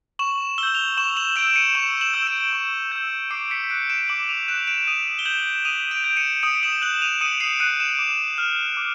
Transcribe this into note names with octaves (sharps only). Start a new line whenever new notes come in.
C#6 E7 F#7
E6 G7
G6 F#7
F7 G7
C#6 E7 F#7
E7 F#7
E6 G6 D7 E7
C#7 D#7
C#6 E7 F#7
E7 F#7
E6 G6
D7 E7
C#6
E6 G6
D6 C7 D7
B6 C#7
F#6 C7 D7
D7 E7
D6 E7 F#7
D#7 F7
F#6 D7 E7
D7 E7
D#6 D#7 F7
G7
G6 E7 F#7
D#6 D#7 F7
D7 E7
G6
C#7 D#7
D#6 D7 E7
E7 F#7
F#6 E7 F#7
D#7 F7
D#6 C#7 D#7
C7 D7
F#6 C#7 D#7
D7 E7
D6
F6
D6